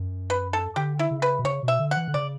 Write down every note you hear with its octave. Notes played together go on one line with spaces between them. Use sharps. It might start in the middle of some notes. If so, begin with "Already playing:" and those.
Already playing: F#2
B4
A4
D3 G4
E4
C#3
B4
B2
C#3 C#5
B2
E5
D3
F#5
E3
D3
C#3 D5